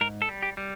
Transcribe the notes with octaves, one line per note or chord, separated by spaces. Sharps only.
G#2 A#4
A4
G3
G4
G3